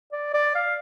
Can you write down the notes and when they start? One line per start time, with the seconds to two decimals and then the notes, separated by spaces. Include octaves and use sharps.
0.12 D5
0.34 D5
0.55 F5